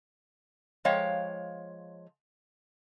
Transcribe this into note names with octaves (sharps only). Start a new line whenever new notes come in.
F3 G#3 C#5 F5 G5